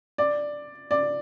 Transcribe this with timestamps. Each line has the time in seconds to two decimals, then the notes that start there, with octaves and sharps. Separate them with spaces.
0.18 D5
0.91 D5